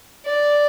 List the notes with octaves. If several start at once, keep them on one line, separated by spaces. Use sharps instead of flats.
D5